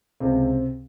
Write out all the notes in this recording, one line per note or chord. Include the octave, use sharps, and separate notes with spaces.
C#2 C3 C4